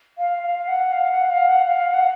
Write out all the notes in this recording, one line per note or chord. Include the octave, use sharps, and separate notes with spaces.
F5
F5
F#5
F5
F#5
F5
F#5
F5
F#5